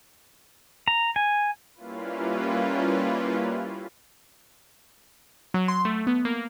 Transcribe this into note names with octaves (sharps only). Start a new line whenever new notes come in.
A#5
G#5
G3 A#3 C#4 E4 F4 B4
F#3
C6
A3
B3
A#3